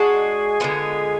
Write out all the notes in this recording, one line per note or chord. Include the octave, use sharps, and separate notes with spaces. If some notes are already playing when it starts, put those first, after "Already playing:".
Already playing: G#3 D4 F#4 G#4
D3 G#3 B3 F4